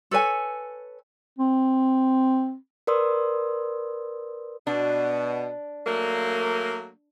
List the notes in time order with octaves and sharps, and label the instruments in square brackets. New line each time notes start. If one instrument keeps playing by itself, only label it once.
[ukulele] A4 B4 C#5 G#5
[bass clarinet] C4
[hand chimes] A#4 B4 D5 C6 D#6 E6
[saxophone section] B2 [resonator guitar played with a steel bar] D4
[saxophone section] F#3 A3 A#3